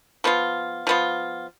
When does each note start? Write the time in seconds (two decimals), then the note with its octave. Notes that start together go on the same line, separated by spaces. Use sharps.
0.24 F3 B3 F4
0.87 F3 B3 F4